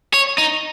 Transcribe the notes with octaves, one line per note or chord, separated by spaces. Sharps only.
C#5
D#4